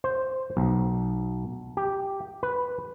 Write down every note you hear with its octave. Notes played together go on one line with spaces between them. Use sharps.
C5
B1
G4
B4